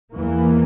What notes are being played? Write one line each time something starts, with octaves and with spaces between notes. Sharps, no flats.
E2 E3 A#3